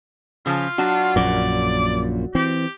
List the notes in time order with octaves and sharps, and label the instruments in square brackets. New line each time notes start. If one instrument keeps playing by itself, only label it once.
[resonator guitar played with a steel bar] C#3 F3 C#4 [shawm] F4
[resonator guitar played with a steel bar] F#3 D4 F#4
[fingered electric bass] A#1 F#2 A#2 [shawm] D5
[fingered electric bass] E3 C4 [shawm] G4